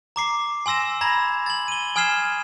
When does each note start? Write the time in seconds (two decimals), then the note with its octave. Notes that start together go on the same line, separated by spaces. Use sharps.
0.16 A#5 D6 C7
0.66 G#5 C6 E6 A#6 E7
1.01 A#5 B5 G#6 A#6
1.46 A6 F#7
1.68 D#7 G7
1.96 G#5 D#6 F6 G#6 C7 E7